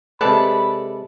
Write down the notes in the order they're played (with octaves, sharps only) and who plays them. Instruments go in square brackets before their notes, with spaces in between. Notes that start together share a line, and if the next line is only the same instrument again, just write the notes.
[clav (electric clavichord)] C3 G#3 B4 [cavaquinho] A4 D5 A5 [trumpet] B5